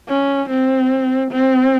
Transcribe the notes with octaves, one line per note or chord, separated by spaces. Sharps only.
C#4
C4
C4